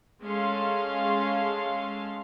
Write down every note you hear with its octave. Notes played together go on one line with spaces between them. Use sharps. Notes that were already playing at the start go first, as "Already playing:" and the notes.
G#3 C#4 A4 F5 C6